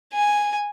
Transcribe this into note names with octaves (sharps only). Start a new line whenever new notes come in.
G#5